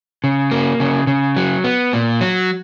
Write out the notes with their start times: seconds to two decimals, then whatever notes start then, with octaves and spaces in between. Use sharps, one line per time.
0.24 C#3
0.51 A#3
0.80 C#3
1.07 C#3
1.37 F#3
1.64 B3
1.93 A#2
2.21 F#3